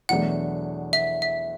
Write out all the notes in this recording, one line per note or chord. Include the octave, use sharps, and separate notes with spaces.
E2 B2 F#3 A3 D4 F#5
E5
E5